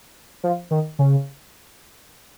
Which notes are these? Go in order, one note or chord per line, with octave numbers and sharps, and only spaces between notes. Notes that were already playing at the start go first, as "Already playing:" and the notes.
F3
D#3
C#3